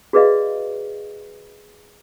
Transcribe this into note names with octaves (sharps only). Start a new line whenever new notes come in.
F#4 G#4 B4 D5 D#5 F5